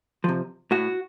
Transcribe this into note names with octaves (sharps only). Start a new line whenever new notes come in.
C3 F3
A2 F#4